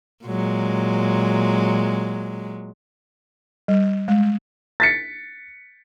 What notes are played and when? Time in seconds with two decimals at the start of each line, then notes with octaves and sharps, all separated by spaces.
0.25 A#2 F#3 G#3
3.68 G3
4.08 G#3
4.80 A6 B6 C#7